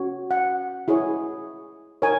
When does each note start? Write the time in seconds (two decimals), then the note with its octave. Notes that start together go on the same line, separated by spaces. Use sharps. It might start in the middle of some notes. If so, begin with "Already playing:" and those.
Already playing: C#4 F#4 C#5
0.31 F#5
0.88 E4 G#4 C#5
2.02 D#4 A#4 C#5 G#5